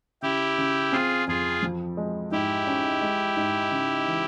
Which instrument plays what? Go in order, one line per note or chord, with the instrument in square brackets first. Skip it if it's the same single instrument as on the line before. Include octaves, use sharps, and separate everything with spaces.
[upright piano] C#3 [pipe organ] E4 G4
[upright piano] C#3
[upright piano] C4 [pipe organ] F4 G#4
[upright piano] F2 [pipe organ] F4 G#4
[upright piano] F3
G#3
[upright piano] G#2 [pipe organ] E4 G4
[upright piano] C#4
G#3
G#2
C#3
E3